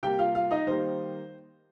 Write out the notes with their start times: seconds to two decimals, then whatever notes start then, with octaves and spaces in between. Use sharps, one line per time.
0.03 C3 G3 A#3 G4 G5
0.19 F4 F5
0.35 F4 F5
0.51 D#4 D#5
0.67 D#3 G3 A#3 C5